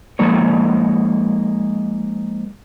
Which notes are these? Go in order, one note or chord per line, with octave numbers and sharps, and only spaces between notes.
F3 G#3 A#3 D#4 C#5